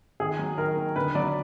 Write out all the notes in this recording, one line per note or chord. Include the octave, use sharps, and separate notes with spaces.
D#3 G#4
F#3
D#3 A#4
D#3
D3 B4
F#3 D5